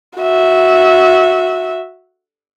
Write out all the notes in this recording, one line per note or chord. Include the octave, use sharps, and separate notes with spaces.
F#4 E5